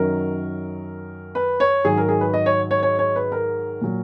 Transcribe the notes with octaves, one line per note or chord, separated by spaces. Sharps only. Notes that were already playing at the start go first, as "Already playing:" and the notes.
Already playing: F#2 D#3 F#3 A#4
B4
C#5
G#2 D#3 F#3 G#4
A#4
G#4
B4
D#5
C#5
C#5
C#5
C#5
B4
A#4
A#2 F#3